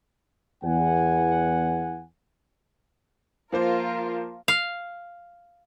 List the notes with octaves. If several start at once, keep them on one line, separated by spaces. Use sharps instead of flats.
E2 E3 F#5 G#5
F3 A#3 F4 A#4 C5
F5